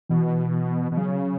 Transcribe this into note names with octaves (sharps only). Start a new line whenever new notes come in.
B2 E3
B2
C#3 F#3